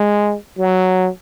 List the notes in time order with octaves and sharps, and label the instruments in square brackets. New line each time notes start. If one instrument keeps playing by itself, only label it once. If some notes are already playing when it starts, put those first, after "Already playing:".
Already playing: [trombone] G#3
F#3